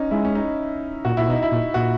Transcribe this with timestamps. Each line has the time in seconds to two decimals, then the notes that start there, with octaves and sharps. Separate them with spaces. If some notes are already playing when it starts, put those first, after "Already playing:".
Already playing: C#4 D#4
0.11 G#3 E4
0.25 C#4
0.35 D#4
1.05 A#2 F#4
1.17 A#2 E4
1.28 B2 D#4
1.43 E4
1.51 A#2
1.74 A#2 F#4